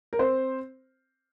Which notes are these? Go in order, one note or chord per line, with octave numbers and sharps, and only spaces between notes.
A#4
C4 C5